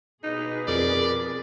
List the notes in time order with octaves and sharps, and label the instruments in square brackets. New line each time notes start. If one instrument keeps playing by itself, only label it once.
[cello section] B2 G#4 B4 [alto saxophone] D#4
[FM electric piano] F2 [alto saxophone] A#4 [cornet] D5